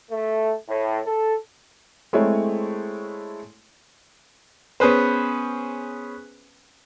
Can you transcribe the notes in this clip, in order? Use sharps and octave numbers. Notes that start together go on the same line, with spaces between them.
A3
A2
A4
G#3 A3 C4 E4 C#5
B3 C#4 G#4 B4 C5